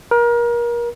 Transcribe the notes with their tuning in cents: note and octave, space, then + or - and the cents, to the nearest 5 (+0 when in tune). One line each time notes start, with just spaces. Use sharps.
A#4 +30